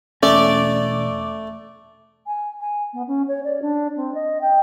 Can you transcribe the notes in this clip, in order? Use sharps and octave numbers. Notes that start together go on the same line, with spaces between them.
E1 A3 C#4 D5
G#5
G#5
B3
C#4
C#5
D5
D4
C4
D#5
G5